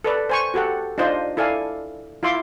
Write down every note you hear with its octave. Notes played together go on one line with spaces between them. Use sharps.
A4 B4 D5
C5 G#5 C#6
F#4 G4 A4 F#5
D4 D#4 F4 C5 D5 D#5
E4 A4 D5 F5 G#5
E4 F4 E5 C6 D6